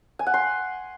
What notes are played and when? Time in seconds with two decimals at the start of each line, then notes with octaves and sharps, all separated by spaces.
0.19 G#5
0.27 F#5
0.34 C6